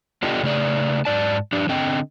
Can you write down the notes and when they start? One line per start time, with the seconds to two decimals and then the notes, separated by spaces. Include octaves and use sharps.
0.22 B3 D4 F4 G4 A4 D#5
0.43 C#3 A3 G#4 D5
1.05 G#2 D5 A5
1.53 F3 D4 G4 D5
1.69 D3 C4 D#5 G5